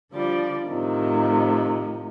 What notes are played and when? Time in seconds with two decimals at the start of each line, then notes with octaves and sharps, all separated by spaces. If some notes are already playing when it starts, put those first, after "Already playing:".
0.13 D3 F3 G3 D5
0.68 A2 C3 D#3 F3